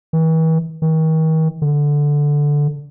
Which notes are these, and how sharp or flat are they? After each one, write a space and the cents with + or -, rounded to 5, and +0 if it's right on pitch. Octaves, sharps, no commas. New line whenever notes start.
E3 -40
D#3 +40
D3 -5